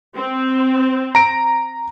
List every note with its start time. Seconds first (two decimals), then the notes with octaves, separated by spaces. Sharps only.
0.15 C4
1.15 A#5 D7